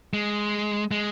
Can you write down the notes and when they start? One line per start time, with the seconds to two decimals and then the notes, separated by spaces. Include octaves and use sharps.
0.14 G#3
0.91 G#3